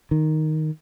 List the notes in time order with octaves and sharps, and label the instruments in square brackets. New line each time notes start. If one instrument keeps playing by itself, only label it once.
[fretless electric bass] D#3